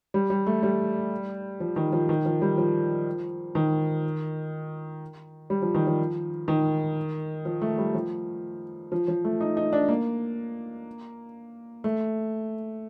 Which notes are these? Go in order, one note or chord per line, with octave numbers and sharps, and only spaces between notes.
G3
G3
A3
G3
F3
D#3
F3
D#3
F3
G3
F3
D#3
G3
F3
D#3
F3
D#3
F3
A3
G3
F3
F3
F3
A3
D#4
D#4
D4
A#3
A3